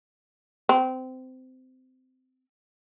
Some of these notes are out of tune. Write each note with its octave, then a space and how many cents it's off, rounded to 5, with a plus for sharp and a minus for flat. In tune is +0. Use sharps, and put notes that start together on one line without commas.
C4 -20